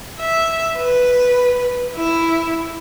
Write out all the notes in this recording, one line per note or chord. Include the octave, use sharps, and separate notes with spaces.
E5
B4
E4